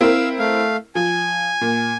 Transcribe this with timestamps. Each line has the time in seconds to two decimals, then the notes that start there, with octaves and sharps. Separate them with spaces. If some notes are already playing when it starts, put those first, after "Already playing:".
0.01 C4 E4 A#4 F5 E6
0.39 A3 F5
0.95 F3 G#5
1.61 A#2